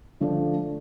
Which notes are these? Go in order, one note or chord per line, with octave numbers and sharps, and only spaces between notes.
D3 F3 A3 D4